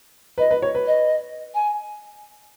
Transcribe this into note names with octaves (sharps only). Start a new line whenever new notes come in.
B4 D#5
B4
C#5
B4
D#5
G#5